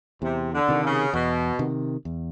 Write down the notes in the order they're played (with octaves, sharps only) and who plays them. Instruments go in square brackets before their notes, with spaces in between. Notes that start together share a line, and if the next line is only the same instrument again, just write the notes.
[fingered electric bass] E2 [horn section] C3
[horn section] D3
[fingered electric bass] C3 D#3
[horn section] C#3
[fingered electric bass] E2 [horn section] B2
[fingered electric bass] C3 D#3
E2